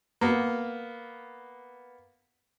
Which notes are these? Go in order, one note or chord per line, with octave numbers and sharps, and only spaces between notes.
A#3 B3